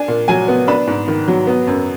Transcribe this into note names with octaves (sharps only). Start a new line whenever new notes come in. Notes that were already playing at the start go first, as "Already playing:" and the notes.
Already playing: D4 G#5
A#2
F#3 G#5
B3
D4 B5
G#2
D#3
F#3
B3
F#2